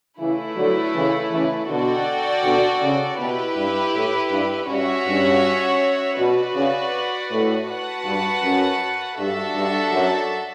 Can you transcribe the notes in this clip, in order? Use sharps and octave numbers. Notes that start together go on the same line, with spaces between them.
C#3 E3 A3 E4 B4
D3 F#3
C#3 E3
C#3 E3
B2 D3 F#4 A4 D5 G5
B2 D3
C#3
B2 E4 G4 B4
G2
A2
G2
G2 C#4 F#4 C#5 E5
G2
B2 F#4 B4 D5
C#3
A2
F#4 B4 F#5 A5
G2
F#2
G2 D4 F#4 A4 E5 A5
G2
F#2